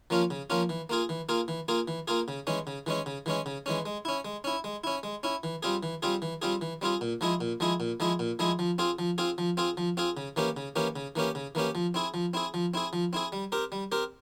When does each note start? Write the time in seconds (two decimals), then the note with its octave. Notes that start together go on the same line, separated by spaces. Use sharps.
0.10 F3 A#3 C#4 F4
0.30 C#3
0.50 F3 A#3 C#4 F4
0.69 E3
0.89 A#3 F4 G#4
1.09 E3
1.29 A#3 F4 G#4
1.48 E3
1.68 A#3 F4 G#4
1.88 E3
2.08 A#3 F4 G#4
2.28 C#3
2.47 E3 G#3 C#4
2.67 C#3
2.86 E3 G#3 C#4
3.06 C#3
3.26 E3 G#3 C#4
3.46 C#3
3.66 E3 G#3 C#4
3.86 G#3
4.05 C#4 E4
4.25 G#3
4.44 C#4 E4
4.64 G#3
4.84 C#4 E4
5.03 G#3
5.23 C#4 E4
5.43 E3
5.63 G3 C4 F4 G#4
5.83 E3
6.02 G3 C4 F4 G#4
6.22 E3
6.42 G3 C4 F4 G#4
6.61 E3
6.82 G3 C4 F4 G#4
7.01 A#2
7.21 F3 G#3 E4 G#4
7.41 A#2
7.60 F3 G#3 E4 G#4
7.80 A#2
8.00 F3 G#3 E4 G#4
8.19 A#2
8.39 F3 G#3 E4 G#4
8.59 F3
8.78 C4 F4 G#4
8.99 F3
9.18 C4 F4 G#4
9.38 F3
9.57 C4 F4 G#4
9.77 F3
9.97 C4 F4 G#4
10.17 C#3
10.36 E3 A#3 C#4 G4
10.57 C#3
10.76 E3 A#3 C#4 G4
10.96 C#3
11.16 E3 A#3 C#4 G4
11.35 C#3
11.55 E3 A#3 C#4 G4
11.75 F3
11.94 C4 E4 G#4
12.14 F3
12.34 C4 E4 G#4
12.54 F3
12.74 C4 E4 G#4
12.93 F3
13.13 C4 E4 G#4
13.32 G3
13.52 C4 G4 A#4
13.72 G3
13.92 C4 G4 A#4